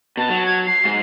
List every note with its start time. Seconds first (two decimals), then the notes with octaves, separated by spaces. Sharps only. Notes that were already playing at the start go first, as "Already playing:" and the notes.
0.17 B2 A5
0.30 F#3
0.45 G#6
0.66 C7
0.85 G#2